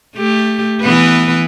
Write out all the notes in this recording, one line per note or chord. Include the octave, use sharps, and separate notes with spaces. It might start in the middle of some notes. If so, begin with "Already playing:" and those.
A3 G4
E3 B3 B4